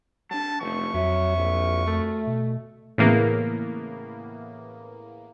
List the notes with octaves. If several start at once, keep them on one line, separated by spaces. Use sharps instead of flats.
F#3 D4 A5
F1 E3 A3 C#6
F2 F#3 F#4 E5
A#1
A3
B2
A2 C#3 E3 A#3 B3